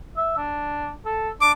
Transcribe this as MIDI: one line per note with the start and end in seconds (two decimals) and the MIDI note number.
0.17 0.33 76
0.37 0.91 62
1.05 1.29 69
1.41 1.53 62
1.41 1.52 86